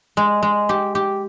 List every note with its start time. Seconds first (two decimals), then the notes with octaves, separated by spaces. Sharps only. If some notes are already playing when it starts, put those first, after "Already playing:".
0.17 G#3
0.43 G#3
0.69 G4
0.95 G4